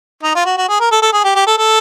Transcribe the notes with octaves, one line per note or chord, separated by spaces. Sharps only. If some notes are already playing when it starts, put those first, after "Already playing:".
D#4
F4
F#4
F#4
G#4
A#4
A4
A4
G#4
G4
G4
A4
A4